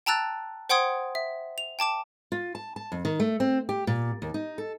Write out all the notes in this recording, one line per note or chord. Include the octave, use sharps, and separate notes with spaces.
G5 A5 A#5 E6 F#6 A6
C5 F#5 G5 C6 D#6 G#6
E5
F7
G5 A5 D6 E7
F4
A5
A5
F2
D#3
A3
C4
G4
A#2
D#2
D#4
A4